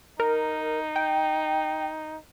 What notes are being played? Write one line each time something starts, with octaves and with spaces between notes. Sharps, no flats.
D#4 A#4
G5